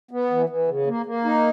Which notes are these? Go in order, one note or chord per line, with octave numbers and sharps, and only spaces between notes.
B3
E3
E3
C#3
A#3
A#3
D#4